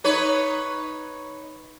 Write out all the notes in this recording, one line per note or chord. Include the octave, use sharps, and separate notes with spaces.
D#4 B4 C#5